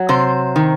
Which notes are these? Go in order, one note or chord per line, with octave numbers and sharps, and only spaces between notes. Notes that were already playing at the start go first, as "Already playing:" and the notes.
Already playing: F#3
C3 C5
D#3